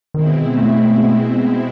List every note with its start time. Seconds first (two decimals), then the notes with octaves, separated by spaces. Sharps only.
0.14 B2 D#3 G#3 C4 E4
0.58 A3